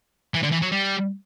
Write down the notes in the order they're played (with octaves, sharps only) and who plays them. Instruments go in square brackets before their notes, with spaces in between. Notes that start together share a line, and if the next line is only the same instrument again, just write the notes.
[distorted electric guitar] E3
D3
E3
F#3
G3